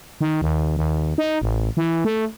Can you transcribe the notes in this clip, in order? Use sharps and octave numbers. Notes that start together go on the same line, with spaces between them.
D#3
D#2
D#2
D#4
A1
E3
A3